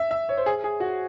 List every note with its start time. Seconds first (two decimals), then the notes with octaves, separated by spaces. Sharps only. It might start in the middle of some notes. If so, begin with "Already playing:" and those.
Already playing: E5
0.11 E5
0.29 C#5
0.37 C5
0.46 G#4
0.64 G#4
0.80 F#4